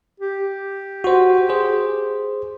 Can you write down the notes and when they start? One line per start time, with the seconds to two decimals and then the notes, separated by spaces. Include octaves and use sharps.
0.20 G4
1.04 F#4 C5
1.49 G#4 C5